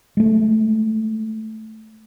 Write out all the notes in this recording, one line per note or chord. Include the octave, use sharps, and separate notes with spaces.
G#3 A3